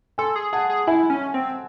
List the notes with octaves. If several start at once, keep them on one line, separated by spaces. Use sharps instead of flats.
A4 G#5 C6
G#4
G#4 F#5 A5
G#4
E4 E5 G#5
C#4
C4